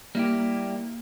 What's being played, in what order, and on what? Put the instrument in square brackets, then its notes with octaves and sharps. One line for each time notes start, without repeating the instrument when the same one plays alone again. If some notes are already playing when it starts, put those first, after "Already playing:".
[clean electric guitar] G3 E4 G4 [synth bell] A#3